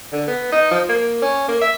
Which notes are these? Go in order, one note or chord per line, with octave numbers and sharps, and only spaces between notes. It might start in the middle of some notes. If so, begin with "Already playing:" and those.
D3
B3
D#4
F3
A#3
C#4
A#3
E5